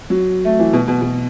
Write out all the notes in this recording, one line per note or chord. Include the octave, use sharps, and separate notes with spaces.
F#3
A3
E3
B2
B2
B2